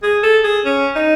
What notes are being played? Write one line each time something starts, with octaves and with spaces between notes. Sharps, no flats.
G#4
A4
G#4
C#4
D#4